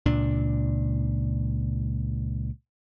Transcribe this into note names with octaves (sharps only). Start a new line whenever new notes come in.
C#2 A#2 D4